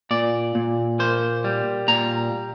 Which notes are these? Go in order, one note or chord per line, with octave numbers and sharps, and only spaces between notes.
A#2 D5
A#2
A#3 C5
G3
A#2 A#5